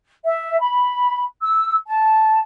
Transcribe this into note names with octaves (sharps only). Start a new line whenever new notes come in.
E5
B5
E6
A5